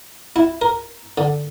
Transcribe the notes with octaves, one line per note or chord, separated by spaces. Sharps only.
E4
A#4
D3